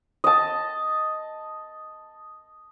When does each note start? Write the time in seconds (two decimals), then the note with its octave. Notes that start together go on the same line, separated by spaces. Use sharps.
0.24 D#5 A5